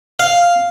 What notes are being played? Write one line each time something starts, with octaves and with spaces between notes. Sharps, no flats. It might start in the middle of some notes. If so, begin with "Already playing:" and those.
F5